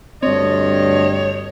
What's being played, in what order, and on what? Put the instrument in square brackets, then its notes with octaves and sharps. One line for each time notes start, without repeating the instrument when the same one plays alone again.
[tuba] D2 [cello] G2 D#5 [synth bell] C4 [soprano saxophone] C#5